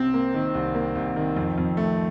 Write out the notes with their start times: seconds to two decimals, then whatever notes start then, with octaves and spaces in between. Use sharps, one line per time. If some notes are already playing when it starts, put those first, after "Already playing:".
Already playing: C2 C3 C4
0.14 A#3
0.34 D#3
0.54 C2
0.75 A#3
0.95 C2
1.16 D#3
1.37 F2
1.58 F2
1.77 A3